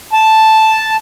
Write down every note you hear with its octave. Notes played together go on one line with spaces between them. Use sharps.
A5